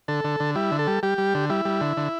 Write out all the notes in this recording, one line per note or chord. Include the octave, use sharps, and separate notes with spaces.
D3 A4
D3
D3
G3 E4
D3
A4
G3
G3 G4
G3
D3
G3 E4
G3
D3
D3